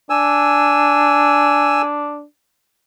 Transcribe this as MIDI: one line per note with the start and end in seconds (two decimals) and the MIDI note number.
0.10 2.24 62
0.10 1.82 80
0.10 1.82 88